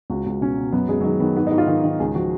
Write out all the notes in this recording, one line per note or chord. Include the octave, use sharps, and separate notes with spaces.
C#2 F#4
C#2
B2 C#4
B2
F#2 B3
F#2 G#3
F#3
D#3 G#3
D#3 B3
G#2 B3
D#4
G#2
F4
D#3
D#3
C#2 G#4
F3 F#4